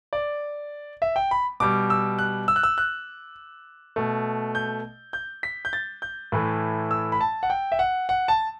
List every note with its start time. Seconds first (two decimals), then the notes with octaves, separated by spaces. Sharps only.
0.13 D5
1.02 E5
1.16 G5
1.31 B5
1.60 B2 G3 D6
1.90 E6
2.19 F#6
2.48 E6
2.56 F#6
2.63 E6
2.78 F#6
3.96 B2 A3
4.55 G6
5.13 G6
5.43 B6
5.65 G6
5.73 A6
6.02 G6
6.32 A2 E3 A3
6.91 E6
7.12 B5
7.21 A5
7.43 F#5
7.50 G5
7.72 E5
7.79 F#5
8.09 F#5
8.28 A5